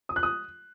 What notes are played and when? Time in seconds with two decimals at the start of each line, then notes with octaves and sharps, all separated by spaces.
0.09 D#6
0.16 F#6
0.23 D#6